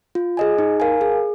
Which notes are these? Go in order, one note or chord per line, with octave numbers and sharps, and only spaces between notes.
F4
G#4 D#5 G#5
D#4
A#4 F5 G#5
G#4